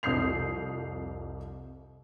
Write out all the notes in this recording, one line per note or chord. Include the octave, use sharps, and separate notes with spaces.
C2 F2 D#6 G6 C7 F7